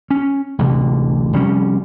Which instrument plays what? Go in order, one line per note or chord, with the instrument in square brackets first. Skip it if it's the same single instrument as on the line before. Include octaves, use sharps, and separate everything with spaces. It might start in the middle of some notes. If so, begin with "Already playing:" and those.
[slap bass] C#4
A1 D2 C3
F1 G3 C#4